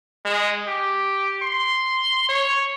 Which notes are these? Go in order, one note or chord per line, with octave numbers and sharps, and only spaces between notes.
G#3
G4
C6
C#5